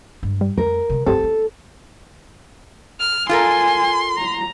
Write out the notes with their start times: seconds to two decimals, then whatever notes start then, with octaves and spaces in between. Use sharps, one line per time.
0.23 G2 G#3
0.41 G3
0.57 F2 A3 A#4
0.90 C3 G#3
1.06 G2 B3 C4 G4 A4 C5
1.19 B3 E4
3.00 F6
3.29 F4 A4 A#4 G#5 C6
4.18 A#5